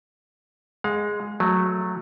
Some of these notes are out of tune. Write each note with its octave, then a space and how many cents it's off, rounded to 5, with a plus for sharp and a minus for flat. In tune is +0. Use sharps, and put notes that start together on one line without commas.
G#3 +0 F5 +40
F#3 -10 A3 +0